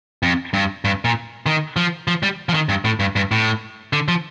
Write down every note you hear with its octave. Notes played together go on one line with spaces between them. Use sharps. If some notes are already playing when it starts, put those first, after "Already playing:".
F2
G2
G2
A#2
D#3
F3
F3
G3
F3
D#3
G2
A2
G2
G2
A2
D3
F3